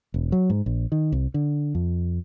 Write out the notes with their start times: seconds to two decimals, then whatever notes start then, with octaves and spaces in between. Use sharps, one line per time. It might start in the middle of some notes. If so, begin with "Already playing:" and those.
0.14 E1
0.32 F#3
0.50 G#2
0.66 A#1
0.92 D#3
1.12 C2
1.34 D3
1.75 F2